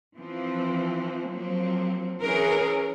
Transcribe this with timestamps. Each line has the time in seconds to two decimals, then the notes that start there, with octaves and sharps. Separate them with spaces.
0.15 E3 F3 C4
1.27 F3 F#3 A#3 C4
2.21 E3 C#4 G#4 A#4 B4